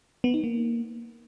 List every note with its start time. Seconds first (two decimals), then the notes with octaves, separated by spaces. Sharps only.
0.24 B3
0.34 D#4
0.44 A#3